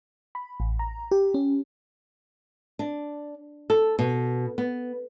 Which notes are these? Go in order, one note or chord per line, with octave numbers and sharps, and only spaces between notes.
B5
A1
A#5
G4
C#4
D4
A4
B2
B3